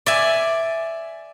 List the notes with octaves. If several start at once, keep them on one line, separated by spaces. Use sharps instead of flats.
D5 E5 G#5